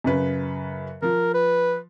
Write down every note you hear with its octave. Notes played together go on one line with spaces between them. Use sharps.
F#2 C#3 B4
F3 A#4
B4